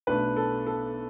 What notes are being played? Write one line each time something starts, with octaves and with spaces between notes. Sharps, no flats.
B1 B2 A3 D4 B4
A4
A4